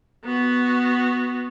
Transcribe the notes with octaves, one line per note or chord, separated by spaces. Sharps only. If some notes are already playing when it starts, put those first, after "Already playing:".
B3 F#4